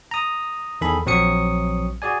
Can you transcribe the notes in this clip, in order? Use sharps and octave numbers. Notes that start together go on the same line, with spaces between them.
A#5 D#6
E2 D#3 G#4 A4 B5
A#1 F#3 C4 C#6 D#6 C#7
F#4 G#4 D5 G#5